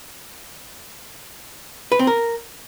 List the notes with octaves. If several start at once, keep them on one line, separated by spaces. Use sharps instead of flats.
B4
C4
A#4